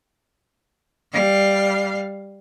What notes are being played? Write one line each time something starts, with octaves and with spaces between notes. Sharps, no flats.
G3 F5